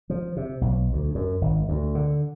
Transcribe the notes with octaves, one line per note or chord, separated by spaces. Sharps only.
F3
C3
B1
D2
F#2
G#1
D2
D3